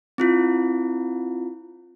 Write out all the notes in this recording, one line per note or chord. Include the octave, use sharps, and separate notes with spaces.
C4 E4 F4